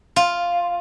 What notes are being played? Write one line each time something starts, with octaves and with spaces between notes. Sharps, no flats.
F4